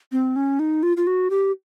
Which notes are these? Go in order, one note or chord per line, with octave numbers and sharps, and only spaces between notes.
C4
C#4
D#4
F4
F4
F#4
G4